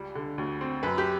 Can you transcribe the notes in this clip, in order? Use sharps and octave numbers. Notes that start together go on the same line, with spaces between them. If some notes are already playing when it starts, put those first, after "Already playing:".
Already playing: C#2 G3
D3
D2
C4
F#2 B4
G4